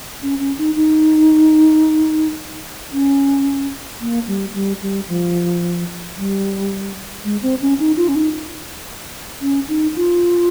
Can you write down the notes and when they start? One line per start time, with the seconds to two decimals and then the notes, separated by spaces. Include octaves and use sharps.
0.22 C#4
0.40 C#4
0.58 D#4
0.76 D#4
2.92 C#4
4.01 A#3
4.27 G3
4.54 G3
4.82 G3
5.08 F3
6.17 G3
7.25 G#3
7.42 C4
7.61 C#4
7.79 D#4
7.97 F4
8.08 C#4
8.15 D#4
9.41 C#4
9.68 D#4
9.96 F4